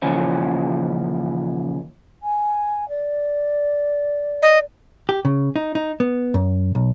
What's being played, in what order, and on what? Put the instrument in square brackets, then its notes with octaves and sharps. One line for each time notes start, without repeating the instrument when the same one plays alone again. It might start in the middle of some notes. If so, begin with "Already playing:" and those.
[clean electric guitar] D#2 A#2 C#3 E3 F3 C#4
[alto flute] G#5
D5
[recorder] D#5
[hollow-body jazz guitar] G4
C#3
D#4
D#4
B3
F#2
B1